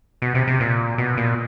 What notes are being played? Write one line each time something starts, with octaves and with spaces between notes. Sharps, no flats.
B2
C3
C3
A#2
B2
A#2